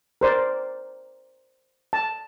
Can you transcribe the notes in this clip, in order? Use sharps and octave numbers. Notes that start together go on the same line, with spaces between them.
A#4 C5 D5
A5